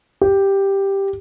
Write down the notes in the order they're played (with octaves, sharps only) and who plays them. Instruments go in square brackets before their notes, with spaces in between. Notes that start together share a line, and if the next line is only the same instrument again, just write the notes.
[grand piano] G4